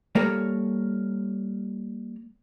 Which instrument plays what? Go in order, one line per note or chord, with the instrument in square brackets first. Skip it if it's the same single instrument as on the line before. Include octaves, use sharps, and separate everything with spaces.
[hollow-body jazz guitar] G3 A#3 A4 A#4 C#5